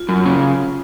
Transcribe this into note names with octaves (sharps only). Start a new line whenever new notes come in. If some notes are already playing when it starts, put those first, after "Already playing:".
Already playing: F4
F#2
C#3